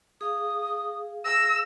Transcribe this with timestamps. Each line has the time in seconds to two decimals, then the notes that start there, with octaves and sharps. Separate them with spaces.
0.21 G#4 F5 D#6
1.25 E6 A#6